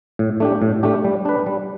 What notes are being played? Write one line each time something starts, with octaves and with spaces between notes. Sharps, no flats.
A2
A3 D4 G4
A2
A3 D4 G4
G3
D4 B4
G3